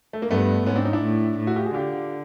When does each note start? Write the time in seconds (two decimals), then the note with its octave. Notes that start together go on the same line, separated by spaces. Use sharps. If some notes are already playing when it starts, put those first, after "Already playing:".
0.13 A3
0.22 A#3
0.30 G2 A3 B3
0.66 G#2 B3 C#4
0.76 C4 D4
0.84 C#4 D#4
0.93 D4 E4
1.03 A2
1.39 A2
1.47 E4 F#4
1.56 F4 G4
1.65 F#4 G#4
1.74 D3 F4 G4